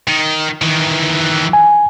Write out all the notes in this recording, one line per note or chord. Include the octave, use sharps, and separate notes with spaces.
D#3
D#3 E3
G#5